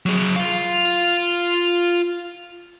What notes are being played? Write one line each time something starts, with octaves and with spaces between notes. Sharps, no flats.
F#3 G#4
F4 F5